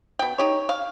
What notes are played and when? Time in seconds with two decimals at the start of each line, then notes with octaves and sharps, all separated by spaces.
0.19 B2 G5
0.38 D#4 G4 C#5
0.69 F5